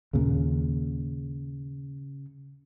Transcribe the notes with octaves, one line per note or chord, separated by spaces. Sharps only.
D#2 A#2 C#3